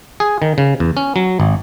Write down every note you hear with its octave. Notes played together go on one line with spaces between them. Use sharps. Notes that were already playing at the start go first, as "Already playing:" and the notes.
G#4
D#3
C#3
E2
C#4
F#3
G#1